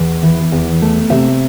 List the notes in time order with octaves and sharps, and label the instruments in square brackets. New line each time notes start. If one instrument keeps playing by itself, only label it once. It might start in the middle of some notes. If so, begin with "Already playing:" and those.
Already playing: [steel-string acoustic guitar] E2
E3
E2
A3
C3 E5